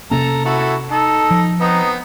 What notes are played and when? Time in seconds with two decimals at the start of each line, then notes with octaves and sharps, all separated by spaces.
0.11 C3 A#3 C#4 A4 A#5
0.45 E4 F#4 A4
0.91 D#4 A4
1.31 F3
1.61 B3 C4 D#4 B4